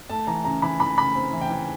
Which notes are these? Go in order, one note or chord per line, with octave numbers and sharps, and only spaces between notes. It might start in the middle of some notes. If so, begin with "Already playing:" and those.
A3 A5
E3 A#5
C#3 A#5
E3 B5
E3 B5
C#3 B5
C4
E3
G5
E3